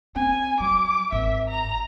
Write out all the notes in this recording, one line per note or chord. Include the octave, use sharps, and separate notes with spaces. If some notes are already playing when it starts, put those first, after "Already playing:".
C4 G#5
F#3 D6
G#1 E5
A#5